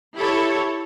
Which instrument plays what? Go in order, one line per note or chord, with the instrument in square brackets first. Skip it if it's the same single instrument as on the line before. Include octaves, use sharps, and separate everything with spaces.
[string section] E4 G4 A4 C#5